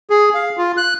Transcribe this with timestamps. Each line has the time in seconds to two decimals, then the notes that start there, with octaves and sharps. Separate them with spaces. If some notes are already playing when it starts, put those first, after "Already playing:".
0.10 G#4
0.34 F5
0.58 F4
0.77 F#6